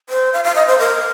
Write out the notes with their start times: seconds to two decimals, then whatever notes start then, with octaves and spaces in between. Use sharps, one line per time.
0.09 C5
0.33 F5
0.44 F5
0.56 D#5
0.67 C5
0.79 A#4